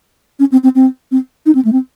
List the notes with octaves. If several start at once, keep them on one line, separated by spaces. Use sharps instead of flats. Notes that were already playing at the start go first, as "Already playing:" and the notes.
C#4
C4
C4
C4
C4
D#4
C4
A3
C4